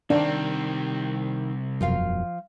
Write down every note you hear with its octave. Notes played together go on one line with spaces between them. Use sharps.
C2 D#3 C4 D4
E1 F#2 F3 F4 F5